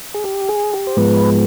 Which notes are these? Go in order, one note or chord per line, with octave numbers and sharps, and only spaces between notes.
G#4
G4
G#4
G4
C5
G#2 F3 G#3 B3 B4